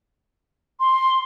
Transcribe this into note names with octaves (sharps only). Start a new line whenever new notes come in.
C6